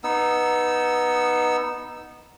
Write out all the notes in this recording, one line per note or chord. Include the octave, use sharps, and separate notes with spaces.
B3 D#4 E6